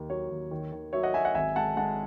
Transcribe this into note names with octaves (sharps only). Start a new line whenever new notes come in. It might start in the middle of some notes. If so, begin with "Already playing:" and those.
Already playing: D#2 D#3
F#3 C#5
D#2
D#3
D#3
F#3 C#5 E5
D#5 F#5
F#3 E5 G#5
D#5 F#5
G#1 E5 G#5
G#3 F#5 A5
G#3 F#5 A5